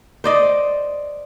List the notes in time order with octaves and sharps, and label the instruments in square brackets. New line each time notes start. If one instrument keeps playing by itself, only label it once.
[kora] C5 D5 D#5